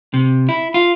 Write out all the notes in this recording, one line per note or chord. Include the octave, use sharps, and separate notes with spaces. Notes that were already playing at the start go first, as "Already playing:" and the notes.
C3
E4
F4